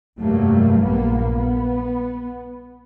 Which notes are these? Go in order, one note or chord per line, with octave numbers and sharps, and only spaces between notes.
F1 G2 F#3 G3 A3 A#3
A#1 G2 A#3 B3
B3